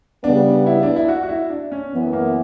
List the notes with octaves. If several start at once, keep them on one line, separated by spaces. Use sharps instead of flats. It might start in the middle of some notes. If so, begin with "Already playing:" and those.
C#3 G3 B3 D4
E4
D4
E4
F#4
F#4
E4
D4
C#4
F#2 E3 B3
A#3